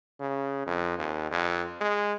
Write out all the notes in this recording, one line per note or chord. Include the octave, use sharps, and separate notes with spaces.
C#3
F2
D#2
F2
G#3